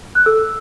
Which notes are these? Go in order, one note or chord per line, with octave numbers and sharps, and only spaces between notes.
F#6
A4 E6